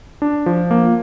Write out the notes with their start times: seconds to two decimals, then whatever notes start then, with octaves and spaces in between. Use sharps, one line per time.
0.22 D4
0.46 F3
0.71 A#3